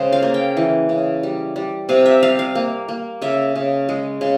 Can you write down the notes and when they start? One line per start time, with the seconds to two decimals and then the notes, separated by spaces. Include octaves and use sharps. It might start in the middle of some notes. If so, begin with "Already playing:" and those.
Already playing: C#3 G#3 C5
0.12 F5
0.23 A#3
0.34 G5
0.57 E3
0.89 C#3
1.23 G3
1.56 G3
1.89 C3 F5
2.06 E5
2.23 G3 F5
2.39 F5
2.55 A#3
2.88 A#3
3.22 C#3 E5
3.55 C#3
3.89 G#3
4.21 C#3